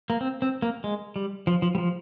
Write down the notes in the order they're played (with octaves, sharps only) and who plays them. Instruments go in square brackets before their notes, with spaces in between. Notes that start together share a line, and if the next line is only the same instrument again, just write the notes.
[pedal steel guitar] A#3
C4
C4
A#3
G#3
G3
F3
F3
G3
F3